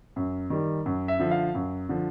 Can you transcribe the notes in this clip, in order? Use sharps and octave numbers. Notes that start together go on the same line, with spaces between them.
F#2
D#3 G3
F#2
E5
D3 F3
F5
F#2
D3 F3